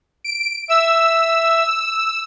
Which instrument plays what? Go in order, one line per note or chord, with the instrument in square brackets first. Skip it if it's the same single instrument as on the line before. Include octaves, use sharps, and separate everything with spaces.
[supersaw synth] D7
[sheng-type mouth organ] E5 [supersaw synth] E6